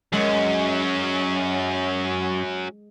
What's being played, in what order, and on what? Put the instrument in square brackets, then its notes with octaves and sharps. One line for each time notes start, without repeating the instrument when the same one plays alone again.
[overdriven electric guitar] F#2 [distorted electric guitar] F#3 C#4 [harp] G#3